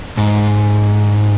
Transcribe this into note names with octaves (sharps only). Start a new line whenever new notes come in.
G#2